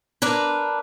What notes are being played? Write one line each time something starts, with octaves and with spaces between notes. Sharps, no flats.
D4 A#4 B4